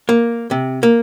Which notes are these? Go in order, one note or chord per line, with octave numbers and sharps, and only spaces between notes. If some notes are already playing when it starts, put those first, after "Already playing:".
A#3
C3
A#3